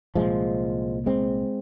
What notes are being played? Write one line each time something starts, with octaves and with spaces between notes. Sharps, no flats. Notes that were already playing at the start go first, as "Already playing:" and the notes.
C2 A#2 F3 G#3
G#3 C4